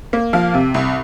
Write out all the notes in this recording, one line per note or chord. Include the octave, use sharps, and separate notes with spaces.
A#3
F3 F5
C3
C2